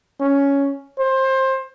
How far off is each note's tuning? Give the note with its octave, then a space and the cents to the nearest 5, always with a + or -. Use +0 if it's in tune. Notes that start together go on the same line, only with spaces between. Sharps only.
C#4 +10
C5 +20